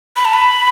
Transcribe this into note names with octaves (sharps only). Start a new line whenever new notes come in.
B5
A5
B5